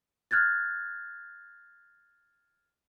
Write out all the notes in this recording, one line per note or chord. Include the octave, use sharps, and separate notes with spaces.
F6 F#6 G#6 A6